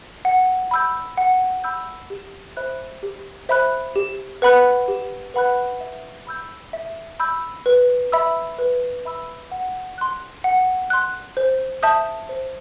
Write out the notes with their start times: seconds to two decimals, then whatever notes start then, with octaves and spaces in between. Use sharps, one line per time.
0.25 F#5
0.71 B5 E6 G6
1.17 F#5
1.64 B5 E6 G6
2.10 G4
2.57 C5 E5 B5 F#6
3.03 G4
3.49 C5 E5 B5 F#6
3.96 G4
4.42 B4 F#5 B5 F#6
4.88 G4
5.34 B4 F#5 B5 F#6
5.80 E5
6.27 B5 E6 G6
6.73 E5
7.20 B5 E6 G6
7.66 B4
8.12 E5 B5 E6
8.58 B4
9.05 E5 B5 E6
9.51 F#5
9.98 C6 F#6
10.44 F#5
10.90 C6 F#6
11.37 C5
11.83 E5 A5 D#6 G6
12.29 C5